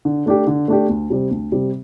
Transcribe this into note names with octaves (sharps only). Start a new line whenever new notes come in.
D3
A3 D4 G4
D3
A3 D4 G4
D2
C3 G3 C4
D2
C3 G3 C4